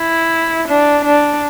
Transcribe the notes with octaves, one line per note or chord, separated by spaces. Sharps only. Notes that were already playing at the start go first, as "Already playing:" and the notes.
Already playing: E4
D4
D4